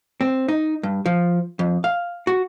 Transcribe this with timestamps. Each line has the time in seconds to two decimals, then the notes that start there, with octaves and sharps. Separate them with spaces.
0.21 C4
0.48 D#4
0.83 G2
1.06 F3
1.59 F2
1.84 F5
2.27 F#4